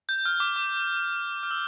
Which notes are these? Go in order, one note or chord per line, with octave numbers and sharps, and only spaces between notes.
G6
F6
D6
D6
F6
E6